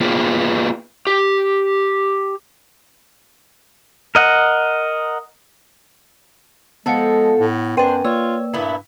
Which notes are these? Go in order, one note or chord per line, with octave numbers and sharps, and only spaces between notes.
A#3 B3 F4 G#4 B4 G5
G4
A#4 D#5 F#5
F3 G#3 B3 A4 F#5 C#7
A2
F#2 D4 B4 C5 G5 D#7
A#3 F4 C#5 D5 E6
G2 A#2 B3 E4